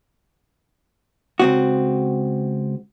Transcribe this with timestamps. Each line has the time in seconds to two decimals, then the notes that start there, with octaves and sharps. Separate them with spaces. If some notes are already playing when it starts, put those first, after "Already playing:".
1.40 C#2 C4 F#4